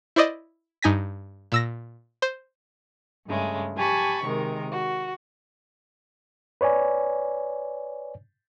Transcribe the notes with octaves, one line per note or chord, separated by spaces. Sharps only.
E4 C5 D5 D#5
G2 D#4 G#5 A#6 B6
A#2 E6 A#6
C5
G2 C#3 G#3 A3
G4 G#5 A5 B5 C#6
C3 D#3 G#3 A#4
F#4
B4 C#5 D5 G#5